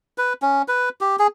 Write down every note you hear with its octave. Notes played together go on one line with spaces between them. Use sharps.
B4
C#4
B4
G4
G#4